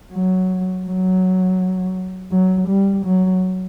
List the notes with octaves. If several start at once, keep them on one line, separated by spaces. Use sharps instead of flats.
F#3
F#3
F#3
G3
F#3